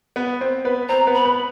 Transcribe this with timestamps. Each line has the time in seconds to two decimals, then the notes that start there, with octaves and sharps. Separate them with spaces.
0.16 B3 B4
0.41 C4 C5
0.65 B3 B4
0.89 C4 C5 A#5
1.07 B3 B4
1.14 B5
1.25 B3 B4